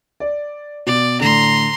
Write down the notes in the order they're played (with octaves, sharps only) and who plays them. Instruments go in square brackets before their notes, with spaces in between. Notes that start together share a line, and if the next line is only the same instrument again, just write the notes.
[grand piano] D5
[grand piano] B2 [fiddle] D5
[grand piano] A2 D3 [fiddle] A#5 C6